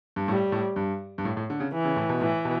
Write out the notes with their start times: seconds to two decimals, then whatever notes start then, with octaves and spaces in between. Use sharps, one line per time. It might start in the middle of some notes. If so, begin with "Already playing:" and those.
0.16 G2
0.28 A2 G3
0.52 A2
0.76 G2
1.18 G2
1.25 A2
1.37 A2
1.50 D3
1.60 C#3
1.73 E3
1.85 C#3
1.96 A2
2.09 B2
2.20 A2 E3
2.45 B2